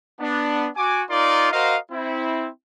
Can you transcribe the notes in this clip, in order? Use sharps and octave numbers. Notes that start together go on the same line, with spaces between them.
B3 D4
F#4 G#5 D6
D#4 F4 A#4 D5 C6 D6
F#4 A#4 C5 D#5 F5
C4 E4